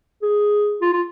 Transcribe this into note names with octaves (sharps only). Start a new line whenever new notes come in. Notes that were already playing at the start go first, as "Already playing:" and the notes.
G#4
F4
F4